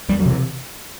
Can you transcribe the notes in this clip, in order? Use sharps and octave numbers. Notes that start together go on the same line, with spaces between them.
E2 G3
F#3
C3
E3